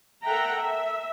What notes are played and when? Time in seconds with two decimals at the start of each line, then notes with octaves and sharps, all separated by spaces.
0.24 A4 A#4 E5 F#5 G5 A#5
0.57 E5